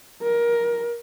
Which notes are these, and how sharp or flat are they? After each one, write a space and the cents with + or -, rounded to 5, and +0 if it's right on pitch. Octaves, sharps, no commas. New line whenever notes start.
A#4 +20